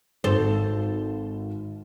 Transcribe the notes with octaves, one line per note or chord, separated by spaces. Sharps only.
G#1 A4 C5